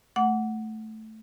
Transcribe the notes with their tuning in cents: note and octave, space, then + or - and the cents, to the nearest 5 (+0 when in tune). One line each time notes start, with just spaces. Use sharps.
A3 +0 F#5 +0 D6 -30